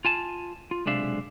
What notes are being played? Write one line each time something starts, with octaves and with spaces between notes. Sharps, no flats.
F4 G#5 A5
F4
B1 C3 G#3 D4 E5 F5